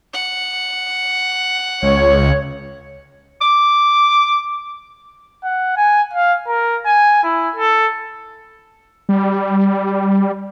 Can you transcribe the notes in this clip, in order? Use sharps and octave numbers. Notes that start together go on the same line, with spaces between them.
F#5
C#2 C#5
D6
F#5
G#5
F5
A#4
G#5
E4
A4
G3